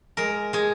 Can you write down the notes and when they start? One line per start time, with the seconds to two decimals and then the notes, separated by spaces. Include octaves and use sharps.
0.17 G#3 A#4
0.53 G#3 G#4